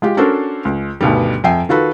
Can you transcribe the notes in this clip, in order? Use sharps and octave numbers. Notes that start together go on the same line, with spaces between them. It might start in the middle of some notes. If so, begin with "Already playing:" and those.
G#3 F4 G4
C#4 D4 F#4 A4 A#4 C5
C#2
D2 G2 B2 D#3 G3
F2 E5 G5 G#5 C7
D#3 F4 F#4 A4 B4